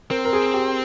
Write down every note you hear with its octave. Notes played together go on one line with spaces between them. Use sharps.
C4 A#4
A#4
G#4
G4